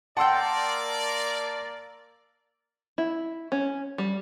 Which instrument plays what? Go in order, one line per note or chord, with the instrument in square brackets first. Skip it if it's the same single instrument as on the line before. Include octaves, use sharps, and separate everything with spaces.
[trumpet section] A#3 A#4 D5 [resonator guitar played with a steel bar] F#5 G5 [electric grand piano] A5 C6 E6
[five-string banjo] E4
C#4
G3